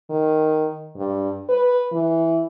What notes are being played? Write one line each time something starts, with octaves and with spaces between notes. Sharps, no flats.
D#3
G2
B4
E3